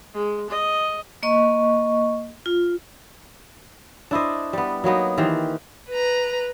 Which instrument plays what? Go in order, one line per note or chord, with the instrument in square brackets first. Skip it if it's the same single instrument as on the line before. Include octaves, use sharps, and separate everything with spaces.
[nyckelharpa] G#3
D#5
[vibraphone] A#3 D#5 C#6
F4
[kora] D4 E4 C5 D#5
G3 B3
F#3 A#3 B3 D#4
D#3 E3 G4 C5
[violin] B4 A#5